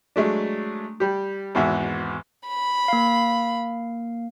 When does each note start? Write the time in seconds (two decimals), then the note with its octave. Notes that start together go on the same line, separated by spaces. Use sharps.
0.16 F#3 G#3 A3 D4
1.00 G3 G4
1.55 G#1 E2 G#2 F#4 E5
2.48 B5
2.88 A#3 F5